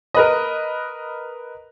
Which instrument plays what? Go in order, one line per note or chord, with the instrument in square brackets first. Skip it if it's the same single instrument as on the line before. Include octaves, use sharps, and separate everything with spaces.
[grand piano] A#4 B4 D#5